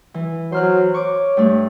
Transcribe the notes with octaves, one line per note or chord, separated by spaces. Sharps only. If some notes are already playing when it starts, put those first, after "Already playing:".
E3
F#3 C5 F6 F#6
C#5 C#6 D6
G2 A3